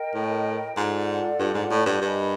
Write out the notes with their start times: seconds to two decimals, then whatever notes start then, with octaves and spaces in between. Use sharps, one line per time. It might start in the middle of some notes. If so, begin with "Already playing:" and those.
Already playing: A#4 D#5 G5
0.14 A2
0.76 G#2 F4 A4 D5 F#5
1.39 G2
1.54 G#2
1.70 A2
1.86 G2
2.02 G2 A#4 D#5 G#5 B5